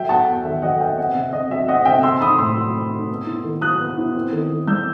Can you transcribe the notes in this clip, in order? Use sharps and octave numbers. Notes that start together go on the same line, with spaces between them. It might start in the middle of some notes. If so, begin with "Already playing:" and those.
Already playing: F#3 E5 G5
B3 F#5 A5
E2
D#3 E5
F#3 D#5 F#5
B3 E5 G5
C4 D#5 F#5
C3 E5
C3 D#5
F#3 E5
C4 D#5 F#5
C3 E5 G5
C4 C6 E6
D#4 B5 D#6
A2 C6 E6
F#3
C4
D#4
B3
E4
D#3
F#3 D#6 F#6
B3
E4
C4
D#3
D#3
G3 E6 G6